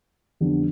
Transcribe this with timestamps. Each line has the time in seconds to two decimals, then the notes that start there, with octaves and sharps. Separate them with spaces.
0.40 F2 D3 G3 B3 D4